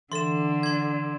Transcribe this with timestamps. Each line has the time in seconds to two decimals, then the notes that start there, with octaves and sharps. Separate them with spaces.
0.12 D3 E3 A4 C6 E7
0.63 C6 G#6